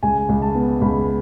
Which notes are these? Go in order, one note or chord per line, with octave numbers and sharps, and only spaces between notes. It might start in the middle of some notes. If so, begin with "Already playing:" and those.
C#2 G#5
C#2
A5
B3
C#2 B5